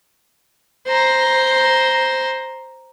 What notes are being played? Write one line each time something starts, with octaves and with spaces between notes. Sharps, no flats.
C5 A#5